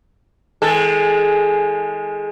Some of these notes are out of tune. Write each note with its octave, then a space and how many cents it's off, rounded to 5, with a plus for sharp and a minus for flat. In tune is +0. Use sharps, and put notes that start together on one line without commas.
E3 -45 G#3 +0 A4 +0